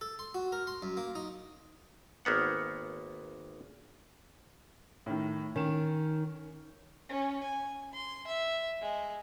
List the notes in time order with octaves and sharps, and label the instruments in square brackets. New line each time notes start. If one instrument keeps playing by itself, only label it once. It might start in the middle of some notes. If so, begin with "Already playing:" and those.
[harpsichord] A4
C6
F#4
A#4
C6
F#2
A#3
D#4
[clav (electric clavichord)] G#1 A#3 B3 F#5
[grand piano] A2 D#3
[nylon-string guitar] D#3 [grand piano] C#4 E7
[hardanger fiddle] C#4
G#5
C6
E5
G#3